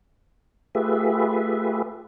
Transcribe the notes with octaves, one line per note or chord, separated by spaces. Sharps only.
A3 F4 G4 G#4 B4 E5